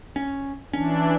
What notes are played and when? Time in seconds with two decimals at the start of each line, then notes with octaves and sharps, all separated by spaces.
0.16 C#4
0.73 E3 C#4 D4